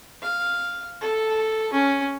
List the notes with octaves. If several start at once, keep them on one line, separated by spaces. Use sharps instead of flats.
F5
A4
C#4